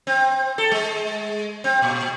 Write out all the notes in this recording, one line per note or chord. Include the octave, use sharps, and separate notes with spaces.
C4
A4
G#3
C4
A#2